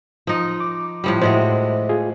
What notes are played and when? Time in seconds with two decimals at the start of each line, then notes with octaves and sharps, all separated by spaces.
0.27 F3 D#4
0.61 D6
1.04 A2 F3 G3
1.21 A2 G#3 F#4 C5 D#5 E5
1.89 F4 G#4